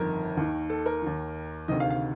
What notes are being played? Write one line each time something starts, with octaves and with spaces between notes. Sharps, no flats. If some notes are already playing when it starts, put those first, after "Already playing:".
Already playing: G1 F2 D#3 A#4
D#2 D#3
A4
A#4
D#2 D#3
D2 C3 D#3 D#5
F5
F5